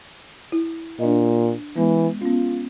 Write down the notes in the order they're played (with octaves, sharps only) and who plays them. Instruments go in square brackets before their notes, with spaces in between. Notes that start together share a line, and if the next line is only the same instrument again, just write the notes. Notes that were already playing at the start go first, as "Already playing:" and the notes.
[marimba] E4
[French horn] A#2 [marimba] D4 D#5
[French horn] E3 [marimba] G#3 B3
[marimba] B3 C#4 [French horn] F4